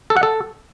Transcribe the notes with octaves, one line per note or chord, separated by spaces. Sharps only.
A4
F#5
A4